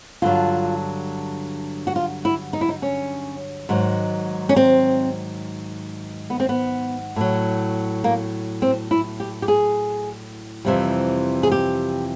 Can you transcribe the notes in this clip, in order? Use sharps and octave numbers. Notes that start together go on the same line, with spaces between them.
G2 D3 F#3 F4
F#4
F4
E4
D#4
E4
D#4
C#4
G#2 D#3 F#3
C#4
C4
B3
C4
B3
A2 F#3
A#3
C4
E4
G4
G4
G#4
F2 C3 E3 G3
G#4
G4